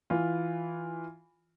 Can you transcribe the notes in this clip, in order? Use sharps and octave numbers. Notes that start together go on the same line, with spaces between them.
E3 F4